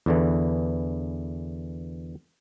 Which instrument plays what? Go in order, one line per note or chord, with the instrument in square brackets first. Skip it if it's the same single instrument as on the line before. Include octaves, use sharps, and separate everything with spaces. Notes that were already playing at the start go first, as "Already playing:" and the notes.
[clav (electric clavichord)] E2 D3 E3